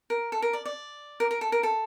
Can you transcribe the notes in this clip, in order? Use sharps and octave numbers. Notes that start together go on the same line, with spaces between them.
A#4
A4
A#4
D5
D5
A#4
A#4
A4
A#4
A4